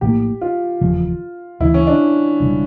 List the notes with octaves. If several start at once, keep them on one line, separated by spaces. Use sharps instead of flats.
A#1 A2 F3 A#3 G4
F4
F1 E2 C#3 F3
D2 C#3 E3 E4
C#4
D4
E1 E2 C#3 G3